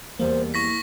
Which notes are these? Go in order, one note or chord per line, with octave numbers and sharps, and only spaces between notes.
E2 G3 A#3 B3 C5
E4 C#6 A#6 B6